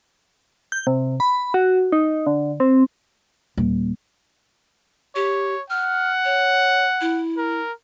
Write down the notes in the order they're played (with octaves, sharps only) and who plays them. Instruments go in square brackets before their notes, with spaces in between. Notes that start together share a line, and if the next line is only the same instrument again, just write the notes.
[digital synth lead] G6
C3
B5
F#4
D#4
D3
C4
[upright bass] D#1
[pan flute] G4 [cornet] C#5
[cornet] F#5 [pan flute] F6
[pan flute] C#5
E4
[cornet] A#4